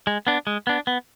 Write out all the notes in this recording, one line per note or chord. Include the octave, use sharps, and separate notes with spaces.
G#3
B3 D4
G#3
B3 D4
B3